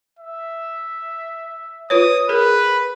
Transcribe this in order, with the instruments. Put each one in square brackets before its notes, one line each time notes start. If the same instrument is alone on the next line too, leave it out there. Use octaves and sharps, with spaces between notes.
[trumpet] E5
[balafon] F4 B4 C#5 [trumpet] D#6
[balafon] G#4 A#4 [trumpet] B4